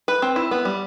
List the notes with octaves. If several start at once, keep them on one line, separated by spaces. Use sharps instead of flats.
B4
C4
E4
B3
G3